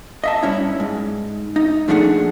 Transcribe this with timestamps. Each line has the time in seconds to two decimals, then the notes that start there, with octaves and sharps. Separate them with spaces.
0.24 D#5 E5 A5
0.43 G2 C#4 E4
0.80 G#2
1.56 D#4
1.88 A#2 F3 A3 D4 G#4 F#5